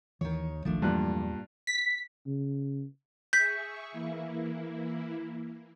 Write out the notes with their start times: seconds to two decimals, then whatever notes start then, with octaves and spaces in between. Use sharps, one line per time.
0.21 D#2 D#3 E3 C#5
0.65 D#1 A#1 D#3 F3 A3 D4
0.82 E2 G2 A#2 E3 F#3 G3 F#6
1.67 B6
2.26 C#3
3.33 G#4 E5 C#6 G6 B6
3.92 E3 A#3 E4